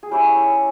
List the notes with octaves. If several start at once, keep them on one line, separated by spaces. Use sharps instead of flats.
G#4
G3 C#4 E4 G4